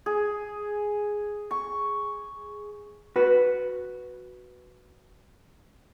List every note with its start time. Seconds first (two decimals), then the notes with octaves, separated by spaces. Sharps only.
0.06 G#4
1.51 C#6
3.16 F#4 B4